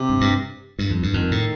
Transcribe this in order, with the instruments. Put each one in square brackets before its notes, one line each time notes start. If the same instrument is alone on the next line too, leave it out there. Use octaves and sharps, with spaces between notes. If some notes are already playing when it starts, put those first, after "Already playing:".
Already playing: [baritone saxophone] C3
[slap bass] G2
G2
G2
F2
G2
[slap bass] F2 [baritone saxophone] D#3
[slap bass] A2